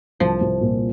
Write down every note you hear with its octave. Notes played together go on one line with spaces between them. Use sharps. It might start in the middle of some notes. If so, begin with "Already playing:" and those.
C2 F3
C2
A#2